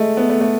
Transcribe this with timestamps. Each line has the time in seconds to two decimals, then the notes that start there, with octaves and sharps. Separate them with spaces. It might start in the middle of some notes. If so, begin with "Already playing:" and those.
Already playing: G#3 A3
0.17 B3
0.30 A3
0.41 A3